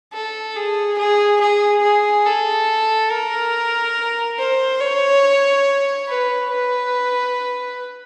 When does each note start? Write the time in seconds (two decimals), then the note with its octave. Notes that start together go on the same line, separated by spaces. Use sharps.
0.13 A4
0.56 G#4
0.98 G#4
1.40 G#4
1.83 G#4
2.26 A4
3.11 A#4
4.39 C5
4.80 C#5
6.08 B4
6.51 B4